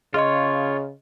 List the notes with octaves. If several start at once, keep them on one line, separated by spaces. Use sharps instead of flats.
C#3 F4 G#4 C#5 D#5 C6